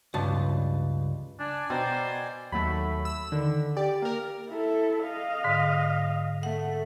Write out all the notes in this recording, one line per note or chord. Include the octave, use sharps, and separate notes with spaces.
C#2 G2 A5
D4 D5 G#5
B2 C5 G5 A#5
D#2 F#3 A3 B5
E6
D3 D#3
G4 D5
A#3 A#4
E4 A4
D#5 F5
G#2 D3
A3 F#5